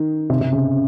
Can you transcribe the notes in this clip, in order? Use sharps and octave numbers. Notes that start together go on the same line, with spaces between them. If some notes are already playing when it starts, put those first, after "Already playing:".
Already playing: D#3
C3
C3
C#3